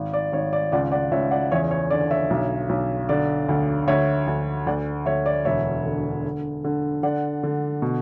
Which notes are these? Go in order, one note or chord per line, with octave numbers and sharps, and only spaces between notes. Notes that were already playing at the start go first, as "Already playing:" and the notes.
Already playing: G#1
D5
G#1 C#5
D5
C#2 D5 F#5
D5 F#5
C#2 C#5 E5
D5 F#5
E2 C#5 E5
C#5
D3 D5
C#5 E5
B1
B1
D3 D5
D2
D2 C#5 E5
D2
D2 D5 F#5
D2 C#5 E5
D5
E1 C#5 E5
D3
D3
D3
D3 D5 F#5
D3
B2